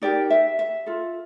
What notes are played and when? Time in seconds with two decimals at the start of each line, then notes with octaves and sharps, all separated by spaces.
0.02 D#4 G4 A#4 D5
0.30 E5
0.59 E5
0.86 F4 A4